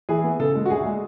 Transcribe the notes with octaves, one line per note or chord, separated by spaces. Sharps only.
E3 G#4
B3
C#3 A4
G#3
F#4
D2 G#4
G#3